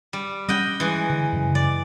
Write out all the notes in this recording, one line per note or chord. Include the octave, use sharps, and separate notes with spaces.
G3
G3 C#4 D#5 F#5 G5
E3 G#3
D3
F#2 C#3
D5